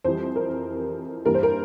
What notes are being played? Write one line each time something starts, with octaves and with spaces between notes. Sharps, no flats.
F2 E3 G3 C5
A#4
G2 E3 G3 A#3 A#4
C5
A#4